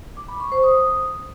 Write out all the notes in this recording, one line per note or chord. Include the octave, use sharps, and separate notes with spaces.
D6
B5
C#6
C5
D#6